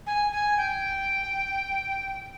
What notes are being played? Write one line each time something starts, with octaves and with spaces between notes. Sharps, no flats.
G#5
G#5
G5